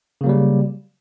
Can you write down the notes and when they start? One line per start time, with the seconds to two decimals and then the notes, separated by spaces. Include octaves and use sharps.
0.21 C#3
0.24 A#3
0.26 F#3
0.29 G3